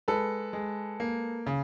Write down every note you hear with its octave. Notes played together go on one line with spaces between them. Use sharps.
G#3 A4 B4
G#3
A#3
C#3